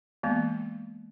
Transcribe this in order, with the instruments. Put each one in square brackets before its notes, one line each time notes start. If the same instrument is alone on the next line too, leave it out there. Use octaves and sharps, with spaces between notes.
[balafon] E3 G#3 A#3 B3